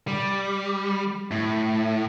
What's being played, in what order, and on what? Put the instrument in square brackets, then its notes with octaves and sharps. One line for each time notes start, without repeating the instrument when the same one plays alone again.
[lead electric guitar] G3
A2